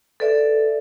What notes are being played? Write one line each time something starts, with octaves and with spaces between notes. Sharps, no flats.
A4 B4 D5 E5